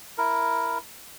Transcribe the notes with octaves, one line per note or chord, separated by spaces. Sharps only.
E4 A#4